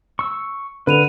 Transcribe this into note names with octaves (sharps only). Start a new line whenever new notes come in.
C#6 E6
D3 B4 B5 D#7 F7